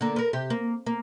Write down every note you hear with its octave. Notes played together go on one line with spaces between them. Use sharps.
D3 A#3
A#4 B4
C3 G4
A#3
A#3